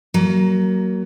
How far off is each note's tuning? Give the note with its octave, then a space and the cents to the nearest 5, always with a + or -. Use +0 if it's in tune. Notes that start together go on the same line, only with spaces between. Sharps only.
F#3 +25 A#3 +0